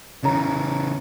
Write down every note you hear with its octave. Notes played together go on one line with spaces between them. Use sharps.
C#3 E3 C#4 A#5